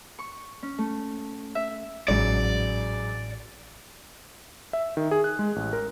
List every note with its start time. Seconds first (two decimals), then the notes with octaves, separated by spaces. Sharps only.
0.19 C#6
0.63 C#4
0.78 A3
1.55 E5
2.08 A1 G#2 C#3 F#3 D5
4.73 E5
4.97 D#3
5.11 G#4
5.24 F#6
5.39 G#3
5.56 A1
5.73 A#4